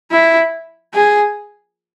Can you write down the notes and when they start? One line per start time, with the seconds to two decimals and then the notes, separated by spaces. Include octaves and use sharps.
0.12 E4
0.94 G#4